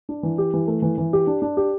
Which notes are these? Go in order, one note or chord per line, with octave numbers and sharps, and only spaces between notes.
D4
E3
G4
E3
A3
E3
E3
G4
D4
D4
G4